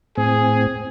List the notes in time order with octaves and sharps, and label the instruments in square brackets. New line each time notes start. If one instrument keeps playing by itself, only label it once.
[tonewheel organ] A2 C4 [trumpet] G#4